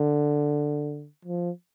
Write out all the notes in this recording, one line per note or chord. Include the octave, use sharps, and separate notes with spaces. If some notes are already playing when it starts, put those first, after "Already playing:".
Already playing: D3
F3